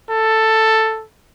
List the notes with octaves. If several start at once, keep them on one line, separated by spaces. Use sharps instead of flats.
A4